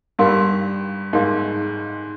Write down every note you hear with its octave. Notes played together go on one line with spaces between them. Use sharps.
G2 G3 D#4 A#4 F5 C6
G#2 G#3 D#4 A#4 F5 C6